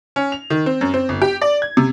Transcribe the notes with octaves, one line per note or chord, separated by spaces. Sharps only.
C#4
F7
D#3
C4
F#2
C4
G1
G4
D5
G#6
C3